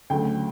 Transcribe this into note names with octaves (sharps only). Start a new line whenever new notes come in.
D2 C#3 F#3 A3 G5